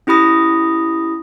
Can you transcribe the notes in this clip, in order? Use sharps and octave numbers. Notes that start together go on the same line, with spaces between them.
C#4 E4 G4 B5 D#6 A#6